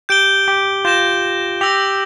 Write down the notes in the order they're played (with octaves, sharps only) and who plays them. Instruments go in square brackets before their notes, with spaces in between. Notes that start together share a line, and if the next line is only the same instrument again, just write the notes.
[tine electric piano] G4 [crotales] G6 D7 G7
[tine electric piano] G4
[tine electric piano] F4 [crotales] G6 A#6 E7 G7
[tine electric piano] G4 [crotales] E6 A#6 F7